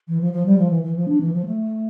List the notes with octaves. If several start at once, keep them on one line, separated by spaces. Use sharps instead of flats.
E3
F3
F3
G3
F3
E3
E3
F3
D4
E3
F3
A3